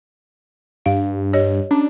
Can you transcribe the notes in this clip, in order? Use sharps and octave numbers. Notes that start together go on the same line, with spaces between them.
G2 F5
G4 C#5 D#5
C#4 D4